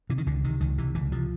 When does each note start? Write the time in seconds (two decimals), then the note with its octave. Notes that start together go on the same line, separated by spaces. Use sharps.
0.10 C3 E3
0.18 D#3
0.26 C#2 D3
0.44 C3 D#3
0.60 C#2 D#3
0.78 C3 E3
0.95 C#2 E3
1.12 C3 F3